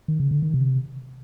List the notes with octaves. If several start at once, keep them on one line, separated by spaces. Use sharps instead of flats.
D#3
C#3
D3
D#3
C3